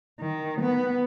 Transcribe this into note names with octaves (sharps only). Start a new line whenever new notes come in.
D#3
B3